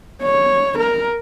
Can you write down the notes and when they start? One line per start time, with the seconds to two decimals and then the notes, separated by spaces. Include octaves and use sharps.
0.23 C#5
0.79 A#4